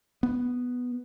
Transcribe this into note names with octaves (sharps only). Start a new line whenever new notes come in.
B3